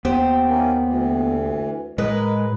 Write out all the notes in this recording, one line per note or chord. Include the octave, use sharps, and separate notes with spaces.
D#2 B3 G4 C5
D#3 A#3 C#4
D2 E3
A2 G#3 A#4 B4 D#5